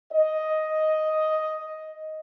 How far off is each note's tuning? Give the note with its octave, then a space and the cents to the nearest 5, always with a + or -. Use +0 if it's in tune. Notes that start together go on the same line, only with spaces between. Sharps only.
D#5 +5